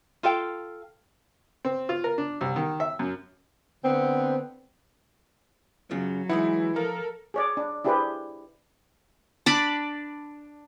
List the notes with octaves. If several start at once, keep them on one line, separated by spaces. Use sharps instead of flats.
F4 A4 F5 G5
C4
F4
A#4
D4
C2
D#3
E5
F#2
D3 B3 C4
F#2 C#3 F#3 F4
E3 G#3 D#4 E4 F#5
F3 A4 A#4
G#4 C#5 D5
D4
D4 E4 G4 G#4 B4 C5
D4 D5 B5